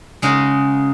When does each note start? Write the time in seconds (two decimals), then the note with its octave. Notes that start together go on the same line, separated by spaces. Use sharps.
0.22 C#3 G#3 D#4 F#4